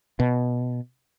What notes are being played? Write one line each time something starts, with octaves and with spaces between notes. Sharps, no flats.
B2